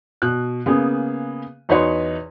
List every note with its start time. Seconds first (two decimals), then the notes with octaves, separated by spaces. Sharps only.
0.22 B2 F#6
0.66 C#3 A#3 B3 G#4
1.69 E2 D#4 F#4 B4 C#5 C6